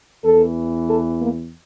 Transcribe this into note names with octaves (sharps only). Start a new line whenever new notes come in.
E2 E3 A4
A4
A#3